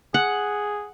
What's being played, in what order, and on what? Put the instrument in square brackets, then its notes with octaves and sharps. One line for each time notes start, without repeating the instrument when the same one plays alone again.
[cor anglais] G#4 [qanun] F#5